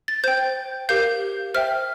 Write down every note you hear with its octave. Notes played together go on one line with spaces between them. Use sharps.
A6
C5 G5 G6
G4 A#4 F5 G6
C5 E5 G5 F6